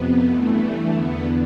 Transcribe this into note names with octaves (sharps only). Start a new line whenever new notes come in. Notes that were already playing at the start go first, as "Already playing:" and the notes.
Already playing: F2 C3 B3
G2 E3 A3
E2 D3 B3